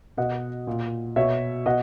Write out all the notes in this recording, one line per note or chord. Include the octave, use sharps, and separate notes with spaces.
B2 D#5 F#5
A#2
B2 C#5 E5
B2 D#5 F#5